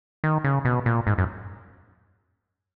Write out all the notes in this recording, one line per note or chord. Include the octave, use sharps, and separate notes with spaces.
D#3
C#3
B2
A#2
G#2
F#2